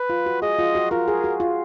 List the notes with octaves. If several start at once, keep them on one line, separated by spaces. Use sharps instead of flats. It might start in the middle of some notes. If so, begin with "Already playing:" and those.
Already playing: B4
F4
F#4
G#4 D#5
F4
F#4
F4 A#4
G#4
F#4
F4